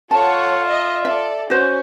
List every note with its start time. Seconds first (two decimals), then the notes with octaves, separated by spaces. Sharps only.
0.11 F4 A4 C#5 F#5 A5
0.67 D#5 E5
1.05 A4 D5 E5
1.50 C#4 F#4 C5